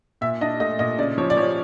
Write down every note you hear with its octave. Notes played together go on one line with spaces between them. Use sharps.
A#2 E5
D4 D#5
A3 D#5
A#2 D#5
C#3 D5
F3 C#5
D5
F3 C#5